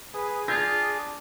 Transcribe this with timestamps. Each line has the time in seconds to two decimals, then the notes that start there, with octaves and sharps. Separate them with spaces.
0.14 G#4 B4
0.48 D4 F4 G6 G#6 A#6